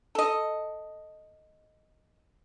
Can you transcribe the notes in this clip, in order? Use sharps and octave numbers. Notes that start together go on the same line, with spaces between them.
A4 D#5